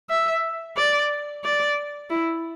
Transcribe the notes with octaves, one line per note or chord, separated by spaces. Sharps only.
E5
D5
D5
E4